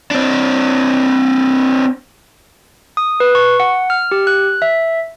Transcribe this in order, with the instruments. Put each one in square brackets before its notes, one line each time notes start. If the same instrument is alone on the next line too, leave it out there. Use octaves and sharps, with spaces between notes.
[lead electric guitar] C4 D4
[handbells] D#6
B4
C#6
F#5
F6
G4
F#6
E5